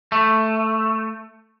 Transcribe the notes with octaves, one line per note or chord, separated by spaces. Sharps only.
A3